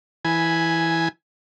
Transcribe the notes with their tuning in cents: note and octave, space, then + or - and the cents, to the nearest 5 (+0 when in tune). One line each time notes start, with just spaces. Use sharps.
E3 -5 G#5 +0 B5 +0